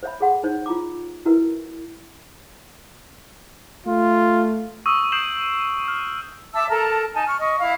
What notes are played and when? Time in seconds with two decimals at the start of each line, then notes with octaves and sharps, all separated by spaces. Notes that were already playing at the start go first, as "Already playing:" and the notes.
0.03 C5 C#5 E5 B5
0.21 G#4 A4 F#5 C6
0.43 D#4 C5 C#5
0.66 F4 A#5 D6
1.25 E4 F#4 A#4 B4 E5
3.87 A3 F4
4.86 C#6 D#6 E6 D#7
5.12 D#6 G6 C7 D7 E7 F#7
5.88 F6
6.54 E5 A5 D6 E6
6.69 A4 A#4 A5 A#5
7.13 D#4 G#5 A5
7.26 C#6 F6
7.38 D#5 C#6
7.59 E4 F5